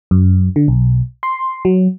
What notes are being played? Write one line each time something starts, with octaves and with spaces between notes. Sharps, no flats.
F#2
D3
B1
C6
F#3